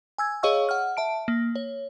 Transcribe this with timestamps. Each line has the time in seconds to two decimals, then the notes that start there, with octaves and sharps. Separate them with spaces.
0.18 G#5 E6 G#6
0.43 G#4 C#5 D#5 F5 C#6 E6
0.69 F#5 F6
0.97 E5 A5 D7
1.28 A#3
1.56 C#5